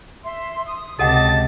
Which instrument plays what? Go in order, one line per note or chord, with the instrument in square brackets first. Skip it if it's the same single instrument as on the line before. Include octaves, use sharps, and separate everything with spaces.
[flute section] E5 C6
D#6
[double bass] C#2 C3 [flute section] G4 D#5 [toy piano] A4 F#5 G5 [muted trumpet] A5